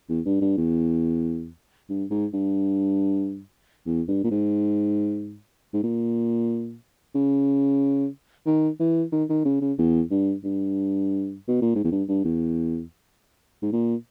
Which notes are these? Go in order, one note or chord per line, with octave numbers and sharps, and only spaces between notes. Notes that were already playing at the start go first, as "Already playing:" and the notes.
E2
G2
G2
E2
G2
G#2
G2
E2
G2
A#2
G#2
G#2
A#2
C#3
D#3
E3
D#3
D#3
C#3
C#3
E2
G2
G2
B2
A#2
G#2
E2
G2
G2
E2
G#2
A#2